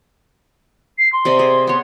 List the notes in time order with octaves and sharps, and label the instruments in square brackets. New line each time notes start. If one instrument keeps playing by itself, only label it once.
[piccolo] C7
C6
[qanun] C3 D5 D#5
G#4
B3 C#5